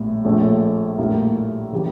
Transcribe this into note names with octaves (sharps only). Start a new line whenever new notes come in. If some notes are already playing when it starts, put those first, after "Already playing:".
Already playing: A#1 A2 G3 A#3
A#1 A#2 F3 A3 C#4
A#1 A2 G3 A#3 E4
C#3 E3 G3 A#3